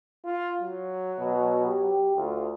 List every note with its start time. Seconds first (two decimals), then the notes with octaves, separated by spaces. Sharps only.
0.24 F4
0.60 F#3
1.19 B2
1.66 G4
2.17 D2 F4